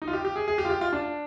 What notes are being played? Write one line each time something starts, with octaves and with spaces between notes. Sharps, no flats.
D#4
F4
G4
G4
G#4
G#4
G4
F4
G4
F4
D4